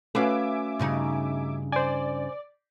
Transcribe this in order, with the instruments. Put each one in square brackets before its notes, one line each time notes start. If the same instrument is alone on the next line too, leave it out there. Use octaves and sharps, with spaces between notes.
[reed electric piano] A3 C#4 F#4 [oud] B4 F5 [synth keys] E5 G#5 D6
[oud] G2 C#3 D#4
[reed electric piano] C5 G#5 [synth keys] D5